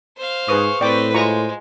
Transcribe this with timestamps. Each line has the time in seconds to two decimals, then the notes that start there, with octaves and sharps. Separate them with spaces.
0.17 C5 F5
0.48 G#2 G#4 B4 C#6 D#6
0.81 A2 C4 B4 D5 G5 D6
1.14 G#3 F4 C5 A#5 C#6